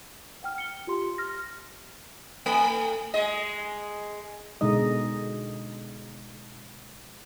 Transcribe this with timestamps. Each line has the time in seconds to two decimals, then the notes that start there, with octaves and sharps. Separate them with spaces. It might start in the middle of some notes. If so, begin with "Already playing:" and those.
0.43 F#5 G5 F6
0.58 C#7 G7
0.87 F4 G4 C6
1.18 F6 A#6
2.46 A3
3.14 G#3 D#5
4.61 B2 D3 G#3 D#4 D#5